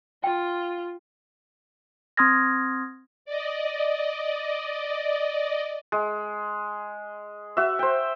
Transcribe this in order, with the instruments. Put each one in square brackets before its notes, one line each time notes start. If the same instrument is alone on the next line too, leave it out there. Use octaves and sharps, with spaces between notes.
[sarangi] F4 [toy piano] G5
[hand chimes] C4 C6 D#6 F6 G#6 A#6
[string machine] D5 D#5
[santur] G#3
F#4 E5
C5 G5